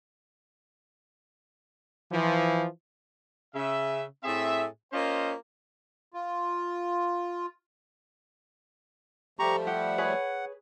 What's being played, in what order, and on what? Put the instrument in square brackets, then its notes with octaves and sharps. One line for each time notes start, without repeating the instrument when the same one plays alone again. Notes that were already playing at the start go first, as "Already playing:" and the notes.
[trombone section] E3 F3
[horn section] C#3 E5
A2 C4 G#4 E5
A#3 C#4 F4 C5 C#5 D#5
[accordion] F4
[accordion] F3 G3 A3 [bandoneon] G4 A#5 C#6
[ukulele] G4 [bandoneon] F#5
[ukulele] G#4 B4 C#5